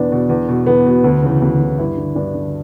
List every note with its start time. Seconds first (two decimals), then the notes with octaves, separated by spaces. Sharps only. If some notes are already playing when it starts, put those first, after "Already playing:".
Already playing: E2 B2 B3 D4
0.12 B2
0.29 E2
0.49 B2
0.66 E2 B3
0.86 B2
1.04 D2
1.23 C#3 E3
1.42 D2
1.60 C#3 E3
1.79 G2 E4
1.97 D3
2.15 G2 D4
2.34 D3